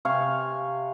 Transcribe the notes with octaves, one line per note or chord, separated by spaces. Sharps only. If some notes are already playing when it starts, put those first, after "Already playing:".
C3 C#5 F5 G#5